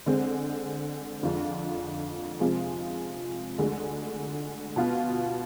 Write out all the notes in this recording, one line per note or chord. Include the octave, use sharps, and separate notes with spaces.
D3 G#3 C4
F2 D3 G#3 D4 F4
C3 F3 G#3 C4 F4
D2 D3 G#3
B2 B3 F4